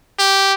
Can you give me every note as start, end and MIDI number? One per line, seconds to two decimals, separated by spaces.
0.19 0.54 67